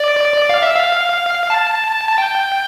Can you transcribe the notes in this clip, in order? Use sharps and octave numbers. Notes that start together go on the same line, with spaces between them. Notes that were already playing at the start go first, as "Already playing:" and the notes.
Already playing: D5
F5
E5
F5
A5
A5
G5